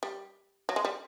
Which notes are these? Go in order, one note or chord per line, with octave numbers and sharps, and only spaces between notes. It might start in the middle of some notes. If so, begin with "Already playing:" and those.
G3
F#3
G#3
G3